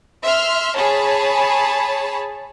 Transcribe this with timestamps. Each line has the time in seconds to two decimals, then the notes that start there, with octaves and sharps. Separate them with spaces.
0.23 E5 C6 F6
0.76 G#4 C#5 A5 B5